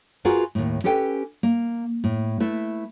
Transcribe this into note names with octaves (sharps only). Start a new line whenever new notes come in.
F4 F#4 G#4 A#4 B4 F#5
D#2 A2
C#4 G4 A4 B4 G5
A#3
A2
A3 E4 B4